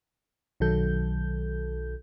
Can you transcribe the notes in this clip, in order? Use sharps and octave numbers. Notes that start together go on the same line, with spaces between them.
B1 D#3 F#3 A4 G6